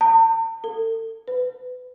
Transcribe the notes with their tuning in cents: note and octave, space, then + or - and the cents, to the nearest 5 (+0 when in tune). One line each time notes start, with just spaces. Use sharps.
A5 +45
A4 +35
B4 +25